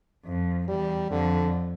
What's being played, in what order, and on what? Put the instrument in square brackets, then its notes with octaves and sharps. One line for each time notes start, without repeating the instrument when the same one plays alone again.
[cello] F2
[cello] E2 [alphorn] G3
[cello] F2 [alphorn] D3